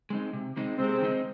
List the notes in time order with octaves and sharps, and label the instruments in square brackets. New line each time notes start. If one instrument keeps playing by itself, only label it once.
[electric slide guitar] G#3 C4 D#4
C3
D#3 G#3 C4 D#4
[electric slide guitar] C3 [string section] G#3 C4
[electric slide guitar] D#3 G#3 C4 D#4